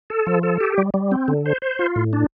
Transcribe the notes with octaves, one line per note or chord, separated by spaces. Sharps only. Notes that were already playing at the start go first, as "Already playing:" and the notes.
A4
F3
A4
G4
G3
G3
C4
D3
C5
C5
F4
A2
D4